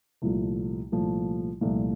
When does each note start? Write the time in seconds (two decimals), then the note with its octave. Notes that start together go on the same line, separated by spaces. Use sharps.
0.22 C2 A#2 F3 A3
0.92 C2 A#2 F3 A3
1.61 C2 A#2 F3 A3